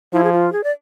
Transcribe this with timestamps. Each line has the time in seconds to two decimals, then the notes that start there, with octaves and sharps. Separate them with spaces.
0.13 F3 E4
0.24 G#4
0.32 F4
0.53 G#4
0.64 D5